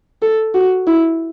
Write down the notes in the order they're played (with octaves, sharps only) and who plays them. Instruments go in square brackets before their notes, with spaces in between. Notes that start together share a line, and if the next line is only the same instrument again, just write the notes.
[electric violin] A4
F#4
E4